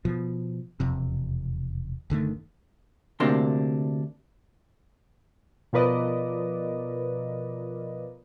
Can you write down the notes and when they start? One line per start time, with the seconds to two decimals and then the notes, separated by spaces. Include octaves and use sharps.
0.05 B2 F3
0.80 E1 F2 C3
2.10 F#1 D3 D#3 A3
3.20 D2 C3 A#3 D4 C6
5.73 B2 F3 A#4 B4 D5 D#5